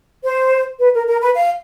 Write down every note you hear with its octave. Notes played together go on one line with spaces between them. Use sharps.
C5
B4
A#4
A#4
B4
F5